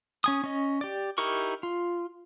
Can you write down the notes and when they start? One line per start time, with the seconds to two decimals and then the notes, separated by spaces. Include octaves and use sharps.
0.24 C#4 G#5 D#6
0.44 C#4 D#5
0.81 G4 D5
1.18 D#4 E4 G4 A#4 C#6
1.63 F4